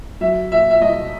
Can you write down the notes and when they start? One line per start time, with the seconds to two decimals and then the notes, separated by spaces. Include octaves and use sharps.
0.21 F#3 E5
0.51 A#2 E5
0.71 E5
0.81 C2 D#5